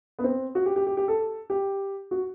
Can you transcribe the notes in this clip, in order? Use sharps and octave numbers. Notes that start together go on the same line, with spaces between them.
B3
C4
F#4
G4
G4
G4
G4
A4
G4
F#4